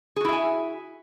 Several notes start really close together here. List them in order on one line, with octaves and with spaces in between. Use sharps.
G#4 F#4 E4 E5 G#5